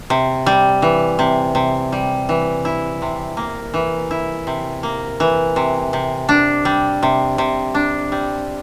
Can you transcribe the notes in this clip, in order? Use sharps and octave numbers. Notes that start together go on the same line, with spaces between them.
C3
G3
E3
C3
C3
G3
E3
E4
C3
A#3
E3
E4
C3
A#3
E3
C3
C3
D4
G3
C3
C3
D4
G3